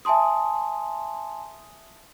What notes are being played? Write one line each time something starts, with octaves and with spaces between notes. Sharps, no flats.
E5 G#5 A5 C6 D#6